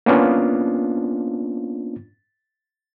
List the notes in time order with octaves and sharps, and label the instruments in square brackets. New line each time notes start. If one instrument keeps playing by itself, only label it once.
[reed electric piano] A#3 B3 C#4 D4 F4